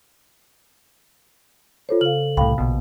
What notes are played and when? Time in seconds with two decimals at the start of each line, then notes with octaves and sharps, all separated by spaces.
1.89 F4 A4 C5 C#5
2.01 C#3 A4 F5 F#7
2.37 C2 A2 F5 G5 B5
2.58 A#1 B2